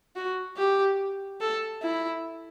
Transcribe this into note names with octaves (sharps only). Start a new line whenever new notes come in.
F#4
G4
A4
E4